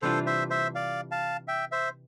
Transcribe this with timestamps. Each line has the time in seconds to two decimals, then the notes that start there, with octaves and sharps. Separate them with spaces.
0.02 C3 E3 G3 D4 F4 A4 C5
0.26 C5 E5
0.50 C5 E5
0.75 D5 F5
1.11 F5 A5
1.48 E5 G5
1.72 C5 E5